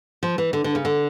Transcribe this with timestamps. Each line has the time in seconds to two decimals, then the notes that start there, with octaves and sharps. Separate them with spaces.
0.23 F3
0.38 E3
0.53 D3
0.64 D3
0.75 C#3
0.85 D3